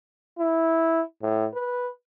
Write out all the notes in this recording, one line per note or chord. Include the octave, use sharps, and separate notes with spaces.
E4
A2
B4